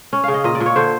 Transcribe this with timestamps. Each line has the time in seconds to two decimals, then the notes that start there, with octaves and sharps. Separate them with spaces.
0.13 C#4
0.24 C#3 F5
0.34 D#5
0.44 A#2 D#5
0.55 D5
0.60 A#2
0.66 C#5
0.76 D3 C5